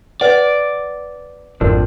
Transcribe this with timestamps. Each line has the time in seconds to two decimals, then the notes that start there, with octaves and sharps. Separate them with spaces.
0.21 B4 D5 F#5
1.61 G#1 F2 F3 D4 A#4